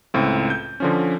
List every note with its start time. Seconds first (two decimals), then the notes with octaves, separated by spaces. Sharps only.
0.14 C#2 A2 C4
0.50 G6
0.80 D3 F3 C#4